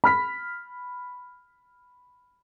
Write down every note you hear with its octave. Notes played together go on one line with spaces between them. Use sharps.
B5 F6 B6